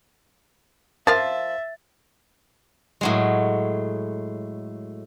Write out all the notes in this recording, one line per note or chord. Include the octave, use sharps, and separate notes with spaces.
F3 A#4 E5 F5 A6
A2 F#3 G#3